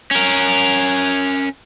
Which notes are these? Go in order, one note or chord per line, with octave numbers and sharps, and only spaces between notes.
C#4 A#4